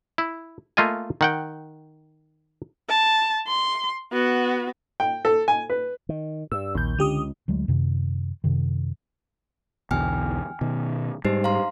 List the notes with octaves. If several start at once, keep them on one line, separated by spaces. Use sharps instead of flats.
E4
A3 A#3 F4 D#5 G#5
D#3 F#5 G5
A5
C6
B3 F#4
G5
A4
G#5
B4
D#3
G2 E6
A#1 D#2 G6
C#2 D3 G4 D#6
D2 F#3 G#3 A3
F#2 C3 D#3
F#2 C3 D#3
B1 E2 D3 G5 G#5 F6
B2 D#3
G#2 G3 D#4 G4 C5
F5 A#5 C6